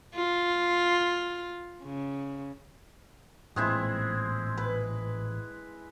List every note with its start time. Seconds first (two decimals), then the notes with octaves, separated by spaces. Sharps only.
0.15 F4
1.83 C#3
3.56 A1 A#2 G#3 C4 E4
4.57 B4